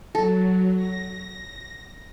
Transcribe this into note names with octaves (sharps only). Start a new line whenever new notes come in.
F#3 A4
A#6